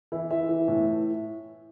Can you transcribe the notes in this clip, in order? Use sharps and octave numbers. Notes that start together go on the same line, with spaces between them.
E3 E4
E3 E5
E3
A2